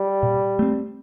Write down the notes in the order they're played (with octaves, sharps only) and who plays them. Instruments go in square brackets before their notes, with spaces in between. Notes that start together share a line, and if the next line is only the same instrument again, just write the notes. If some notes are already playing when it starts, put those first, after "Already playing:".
Already playing: [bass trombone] G3
[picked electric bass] A#2
A3 C4